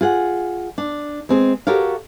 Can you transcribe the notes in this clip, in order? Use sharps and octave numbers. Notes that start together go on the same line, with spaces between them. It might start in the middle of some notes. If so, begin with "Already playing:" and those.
F4 G#4 F#5
D4
G#3 C4 G#4
F#4 G4 A4 A#4 C#5 F5